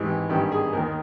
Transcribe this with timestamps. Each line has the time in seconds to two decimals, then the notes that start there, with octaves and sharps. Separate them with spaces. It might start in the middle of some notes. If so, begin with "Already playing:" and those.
Already playing: G#1 G#2 E3 G4
0.29 G#1 G2 D#3 G4
0.52 G#4
0.73 D#2 D#3 A#4